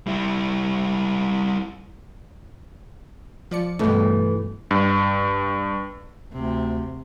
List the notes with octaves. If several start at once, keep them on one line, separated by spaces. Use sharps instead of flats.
G3 E4
F3 D5 C#7
G2 B2 E3 A3
G2
D2 C3